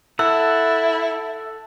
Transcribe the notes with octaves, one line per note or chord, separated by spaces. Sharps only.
E4 A4 F#5 E6